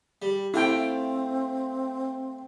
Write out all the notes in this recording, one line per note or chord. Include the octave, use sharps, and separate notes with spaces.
G3
A3 C4 E4 F4 G5